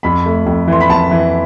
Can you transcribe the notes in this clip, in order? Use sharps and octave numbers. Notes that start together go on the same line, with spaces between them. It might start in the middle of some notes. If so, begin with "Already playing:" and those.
F2 B5
A3
F2
E3 C6
B5
F2 A5
E3